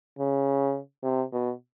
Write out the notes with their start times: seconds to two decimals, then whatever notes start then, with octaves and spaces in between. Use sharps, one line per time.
0.19 C#3
1.03 C3
1.32 B2